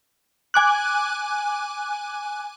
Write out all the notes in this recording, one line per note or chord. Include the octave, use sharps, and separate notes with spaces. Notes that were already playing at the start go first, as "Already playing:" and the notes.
G#5 D6 F#6